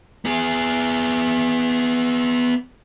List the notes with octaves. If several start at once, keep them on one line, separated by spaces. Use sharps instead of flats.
B3 G#4